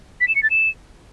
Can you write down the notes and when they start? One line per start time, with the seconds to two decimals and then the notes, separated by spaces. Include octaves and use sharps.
0.21 B6
0.28 E7
0.36 C#7
0.43 A6
0.50 E7